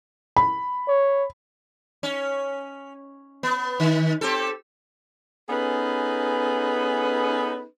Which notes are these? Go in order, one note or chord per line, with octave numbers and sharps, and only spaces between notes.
B5
C#5
C#4
B3
D#3
C4 G4 A4
B3 C#4 D#4 G#4 A4 B4